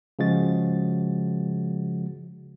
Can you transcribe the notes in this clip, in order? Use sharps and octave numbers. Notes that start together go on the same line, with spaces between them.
C#3 F3 G#3 F#4 A6